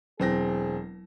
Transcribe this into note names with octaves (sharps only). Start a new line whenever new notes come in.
E1 F#3 C4 E4 G#4 A#6